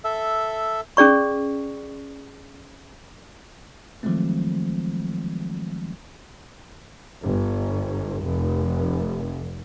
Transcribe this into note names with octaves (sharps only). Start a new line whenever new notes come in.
A4 E5
C#4 G#4 D5 C#6
D#3 F3 F#3 G#3 A3 C4
G1
F1